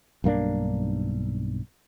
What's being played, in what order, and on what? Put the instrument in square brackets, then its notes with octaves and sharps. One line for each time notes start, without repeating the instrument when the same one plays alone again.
[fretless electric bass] B1 G2 A#3 D4